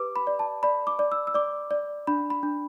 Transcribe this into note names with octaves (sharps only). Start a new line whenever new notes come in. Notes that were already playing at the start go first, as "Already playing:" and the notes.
Already playing: G4 B4 D6
B5
D5
A5
D5 B5
D6
D5
E6
E6
D5 D6
D5
D4 B5
B5
D4